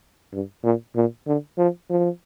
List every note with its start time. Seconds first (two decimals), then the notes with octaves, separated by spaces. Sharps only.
0.33 G2
0.64 A#2
0.96 A#2
1.27 D3
1.58 F3
1.90 F3